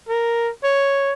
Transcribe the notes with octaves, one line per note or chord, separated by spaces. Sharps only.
A#4
C#5